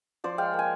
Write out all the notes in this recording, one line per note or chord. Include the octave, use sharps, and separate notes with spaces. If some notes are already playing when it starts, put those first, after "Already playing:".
F3 C5 D5
G#3 F5 G5
A#3
G#5